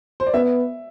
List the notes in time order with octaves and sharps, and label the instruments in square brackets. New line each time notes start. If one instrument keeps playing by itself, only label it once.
[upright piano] C5
D5
[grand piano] B3 [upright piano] E5